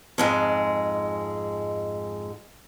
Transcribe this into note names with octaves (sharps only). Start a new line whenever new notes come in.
F2 G#2 G#3